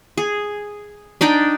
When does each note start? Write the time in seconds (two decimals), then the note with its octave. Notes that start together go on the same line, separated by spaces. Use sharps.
0.17 G#4
1.21 D4 D#4 D5 G5